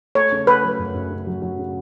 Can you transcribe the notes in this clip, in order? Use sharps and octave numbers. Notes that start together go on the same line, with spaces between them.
A3 C#5
C#3
A3 B4
F#3
F#2
F#2
C#3
F#3
F#3
C#3